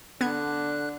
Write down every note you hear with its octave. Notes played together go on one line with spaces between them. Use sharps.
D3 B3 D4 F#6 G#6